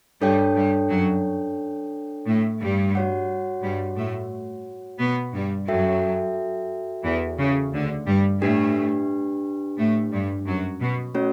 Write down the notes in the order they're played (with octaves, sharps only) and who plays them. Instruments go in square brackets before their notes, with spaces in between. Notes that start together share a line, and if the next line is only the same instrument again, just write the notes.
[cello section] G2 G3 [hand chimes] D4 A4 C#5 G5
[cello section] G2 G3
F#2 F#3
A2 A3
G2 G3
[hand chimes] F#4 C#5 F#5
[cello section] G2 G3
A2 A3
B2 B3
G2 G3
[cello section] F#2 F#3 [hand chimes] F#4 A4 E5 G5
[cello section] E2 E3
C#3
D2 D3
G2 G3
[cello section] A2 A3 [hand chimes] D4 G4 B4
[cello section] A2 A3
G2 G3
F#2 F#3
B2
[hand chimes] A3 C#4 F#4 C#5